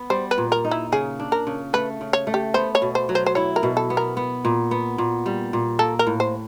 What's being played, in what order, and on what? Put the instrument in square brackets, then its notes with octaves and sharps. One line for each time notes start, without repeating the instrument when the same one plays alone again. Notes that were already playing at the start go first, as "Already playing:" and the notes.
Already playing: [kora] B3
[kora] G3 [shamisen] C5
[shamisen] B4
[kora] A#2
[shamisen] A#4
[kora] D#4
[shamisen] E4
[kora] C#3 [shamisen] G#4
[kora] D4
[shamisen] A#4
[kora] C#3
[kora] A3 [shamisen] B4
[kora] C#3
[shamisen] C#5
[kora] A3
[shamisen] G4
[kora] B3 [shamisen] C5
[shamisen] C#5
[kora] B2
[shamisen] C5
[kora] F#3
[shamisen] C5
C5
[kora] E4 [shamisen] C#5
[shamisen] A#4
[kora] B2
[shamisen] A4
[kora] B3
[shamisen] A#4
[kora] B3
A#2
B3
A#2
G3
A#2
[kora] A#3 [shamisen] A4
[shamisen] A#4
[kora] A2
[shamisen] C5